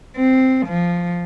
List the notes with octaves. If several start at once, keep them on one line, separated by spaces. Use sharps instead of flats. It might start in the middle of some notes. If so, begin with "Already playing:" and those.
C4
F3